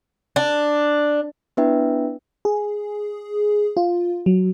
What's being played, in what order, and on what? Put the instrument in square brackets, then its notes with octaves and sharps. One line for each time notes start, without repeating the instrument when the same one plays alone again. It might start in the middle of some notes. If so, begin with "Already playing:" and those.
[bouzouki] D4
[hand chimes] B3 D4 E4 B4 E5 G5
[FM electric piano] G#4
F4
F#3